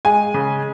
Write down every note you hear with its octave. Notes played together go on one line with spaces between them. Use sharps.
G#3 G#5
C#3